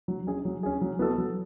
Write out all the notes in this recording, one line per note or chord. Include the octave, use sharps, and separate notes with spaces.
F#3
C#4 G#4
F#3
C#4 G#4
F#3
B3 F#4 A4
F#3